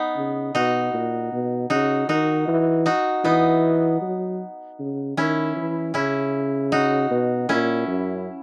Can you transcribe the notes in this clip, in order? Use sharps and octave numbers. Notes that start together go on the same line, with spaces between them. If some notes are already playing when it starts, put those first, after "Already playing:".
Already playing: B3 D#4
C#3
B2 D#4 F#4
A#2
B2
C#3 D#4 F#4
D#3 D#4 F#4
E3
D#4 F#4
E3 B3 D#4
F#3
C#3
D#3 C#4 E4
E3
C#3 C#4 E4
D#4 F#4
B2
A#2 C#4 E4
F#2